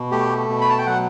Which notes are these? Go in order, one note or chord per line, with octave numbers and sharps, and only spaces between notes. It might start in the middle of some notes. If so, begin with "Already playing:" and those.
Already playing: B2
A3 G4
B2
B5
A5
G5
F#3 F#5